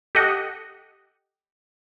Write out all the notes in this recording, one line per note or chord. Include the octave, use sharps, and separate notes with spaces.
G4 A4 D#5 F#5